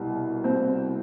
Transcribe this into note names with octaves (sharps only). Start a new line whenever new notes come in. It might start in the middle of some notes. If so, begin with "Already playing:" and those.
Already playing: C2 B2
C4